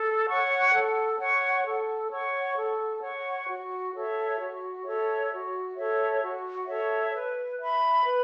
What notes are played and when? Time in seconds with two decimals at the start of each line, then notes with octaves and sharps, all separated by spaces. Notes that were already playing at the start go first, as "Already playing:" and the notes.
Already playing: A4
0.27 C#5 F#5 C#6
0.73 A4
1.18 C#5 F#5 C#6
1.64 A4
2.10 C#5 F#5 C#6
2.55 A4
3.01 C#5 F#5 C#6
3.47 F#4
3.93 A4 C#5 E5
4.39 F#4
4.84 A4 C#5 E5
5.30 F#4
5.76 A4 C#5 E5
6.21 F#4
6.67 A4 C#5 E5
7.13 B4
7.59 E5 B5
8.05 B4